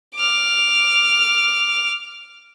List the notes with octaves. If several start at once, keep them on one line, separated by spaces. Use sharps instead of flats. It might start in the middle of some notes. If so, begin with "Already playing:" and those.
D6 F6